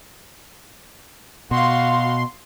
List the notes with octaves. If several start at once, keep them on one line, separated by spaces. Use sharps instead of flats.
B2 F#4 F5 C6